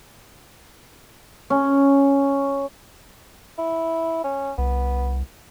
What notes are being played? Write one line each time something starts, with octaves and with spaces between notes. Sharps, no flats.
C#4
E4
C#4
C2 B3